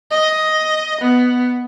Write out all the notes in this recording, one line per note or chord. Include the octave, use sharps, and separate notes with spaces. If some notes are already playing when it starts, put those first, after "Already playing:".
D#5
B3